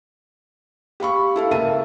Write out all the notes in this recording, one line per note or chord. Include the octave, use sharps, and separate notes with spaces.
G4 F5 B5 C#6
E4 A4 F5
C#2 C#3 A#3 E5 A5 D#7